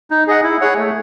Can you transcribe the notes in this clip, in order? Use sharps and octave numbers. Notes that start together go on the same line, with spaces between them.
D#4
G#4 D#5 F#5
E4
G#4 C#5 F#5
A3